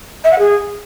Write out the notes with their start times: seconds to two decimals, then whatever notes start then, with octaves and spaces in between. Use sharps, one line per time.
0.24 E5
0.32 F#5
0.39 G#4